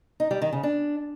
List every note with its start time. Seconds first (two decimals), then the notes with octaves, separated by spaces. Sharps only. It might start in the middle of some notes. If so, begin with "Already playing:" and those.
0.20 D#4
0.31 G3
0.42 D#3
0.52 C#3
0.63 D4